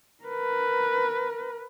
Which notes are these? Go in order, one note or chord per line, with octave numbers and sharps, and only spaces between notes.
A#4 B4